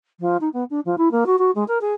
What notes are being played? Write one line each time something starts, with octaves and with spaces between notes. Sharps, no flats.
F3
D#4
B3
D4
F3
E4
A#3
F#4
F#4
G#3
A#4
G#4